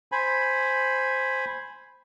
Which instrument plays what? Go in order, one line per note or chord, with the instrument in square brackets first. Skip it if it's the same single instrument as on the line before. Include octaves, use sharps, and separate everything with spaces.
[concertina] C5 G#5 B5